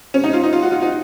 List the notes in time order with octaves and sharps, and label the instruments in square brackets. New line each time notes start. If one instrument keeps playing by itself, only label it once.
[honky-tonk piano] C#4
D#4
F4
D#4
F4
F#4
F4
D#4